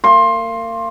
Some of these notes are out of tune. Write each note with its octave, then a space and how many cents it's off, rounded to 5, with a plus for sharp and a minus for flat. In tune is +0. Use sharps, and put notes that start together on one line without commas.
A#3 -30 C6 +20